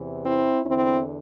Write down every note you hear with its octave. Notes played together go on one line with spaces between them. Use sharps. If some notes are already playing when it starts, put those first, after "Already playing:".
Already playing: E2 C3 E3
C4 E4
E2 D3 C4 E4